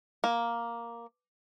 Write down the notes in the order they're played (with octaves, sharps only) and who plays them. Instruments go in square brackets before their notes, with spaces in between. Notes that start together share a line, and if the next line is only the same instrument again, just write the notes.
[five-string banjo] A#3